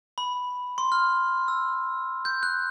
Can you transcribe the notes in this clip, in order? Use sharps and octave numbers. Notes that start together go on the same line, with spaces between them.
B5
C6
F6
E6
G6
F#6